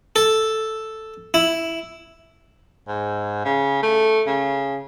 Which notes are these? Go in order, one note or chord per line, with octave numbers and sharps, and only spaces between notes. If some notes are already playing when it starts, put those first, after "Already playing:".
A4
E4
G#2
C#3
A3
C#3